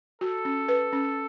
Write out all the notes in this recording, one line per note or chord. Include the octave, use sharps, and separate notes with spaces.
F#4 A4
C#4
B4
C#4